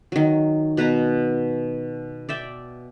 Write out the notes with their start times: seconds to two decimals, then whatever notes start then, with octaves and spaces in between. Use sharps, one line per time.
0.12 D#3 F#3
0.77 B2 B4 F#5 A#5
2.29 D5 E5 G5